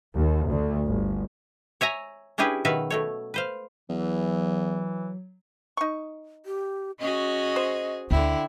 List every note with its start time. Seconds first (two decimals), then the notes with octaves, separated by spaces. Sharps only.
0.15 D#2
0.48 D2
0.85 G1
1.81 C#5 E5 G#5 A#5
2.38 C#4 D4 E4 G4 G#4 B4
2.65 B2 D#3 F#3 B4 E5 F5
2.90 B2 A3 C#5
3.34 B4 C5 F5
3.90 E2 E3 F#3
5.77 D#4 C#6
6.46 G4
7.00 C#4 F#4 G#4 D#5
7.56 C5
8.11 D2 D3 E4 G5